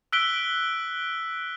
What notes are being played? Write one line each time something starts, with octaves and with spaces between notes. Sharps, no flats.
E6 F#6 B6 D7 G7